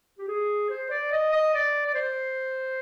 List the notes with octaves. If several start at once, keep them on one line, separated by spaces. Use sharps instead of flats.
G4
G#4
C5
D5
D#5
D#5
D5
D5
C5